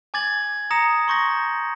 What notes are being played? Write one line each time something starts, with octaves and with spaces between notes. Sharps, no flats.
G#5 D6 G#6 A6 F#7
A#5 D#6 A#6 C#7 E7
C6 C#6 G6 A#6